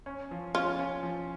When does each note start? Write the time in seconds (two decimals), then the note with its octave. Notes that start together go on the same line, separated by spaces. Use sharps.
0.06 C#4
0.31 F3
0.55 C#4 F4
0.79 C#4
1.03 F3